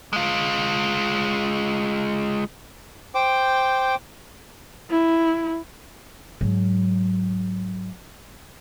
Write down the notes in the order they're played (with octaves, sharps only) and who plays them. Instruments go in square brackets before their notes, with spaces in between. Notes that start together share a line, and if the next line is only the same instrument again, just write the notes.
[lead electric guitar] G#3 F4
[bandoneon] C5 G5 D6
[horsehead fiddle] E4
[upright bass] G#2 F#3